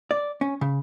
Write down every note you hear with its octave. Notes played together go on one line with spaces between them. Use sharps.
D5
C#4
C#3